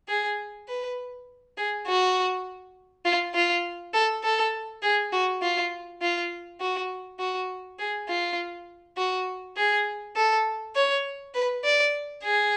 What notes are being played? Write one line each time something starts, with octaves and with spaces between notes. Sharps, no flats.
G#4
B4
G#4
F#4
F4
F4
A4
A4
G#4
F#4
F4
F4
F#4
F#4
G#4
F4
F#4
G#4
A4
C#5
B4
D5
G#4